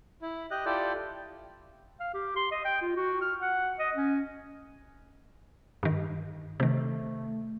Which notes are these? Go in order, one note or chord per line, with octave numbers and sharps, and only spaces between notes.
E4
G4 D#5 F#6
E4 F4 G4 A4 D5
F5
G4
C6
D#5
G5
F4
F#4
F6
F#5
D#5
C#4
G2 D#3
C3 D#3 A3